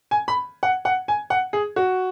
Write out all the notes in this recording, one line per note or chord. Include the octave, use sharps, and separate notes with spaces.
G#5
B5
F#5
F#5
G#5
F#5
G#4
F#4